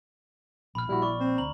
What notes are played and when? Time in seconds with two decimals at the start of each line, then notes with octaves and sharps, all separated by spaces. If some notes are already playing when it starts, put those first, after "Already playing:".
0.75 A#1 B5 F6
0.89 A#1 G3 E4 F#4
1.02 D5 C#6
1.20 C4
1.38 D2 A#5 F#7